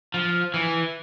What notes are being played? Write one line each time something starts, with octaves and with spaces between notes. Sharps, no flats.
F3
E3